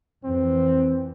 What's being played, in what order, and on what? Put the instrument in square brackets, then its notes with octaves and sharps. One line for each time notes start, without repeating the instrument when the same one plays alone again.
[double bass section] F2 E3 [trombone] C4